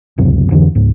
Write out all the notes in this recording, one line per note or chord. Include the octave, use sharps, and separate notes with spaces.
D1 C#2 F#2 C3
F2 D3 E3
C#2 G#2